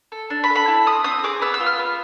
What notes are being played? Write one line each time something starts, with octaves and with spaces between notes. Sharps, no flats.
A4
D4
B5
A4
B5
E4
C4 D#6
C4 D#6
G#4 D6
B3 E6
E6
F4
F6
B3